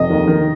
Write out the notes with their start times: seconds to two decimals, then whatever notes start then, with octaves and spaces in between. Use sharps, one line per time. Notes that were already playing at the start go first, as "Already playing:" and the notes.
Already playing: F1 D#5
0.10 D#2
0.28 D#3